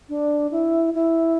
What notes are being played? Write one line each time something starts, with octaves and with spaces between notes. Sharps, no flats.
D4
E4
E4